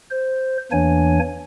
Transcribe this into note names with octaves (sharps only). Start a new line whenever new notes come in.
C5
E2 E3 A#3 D4 C#5 G#5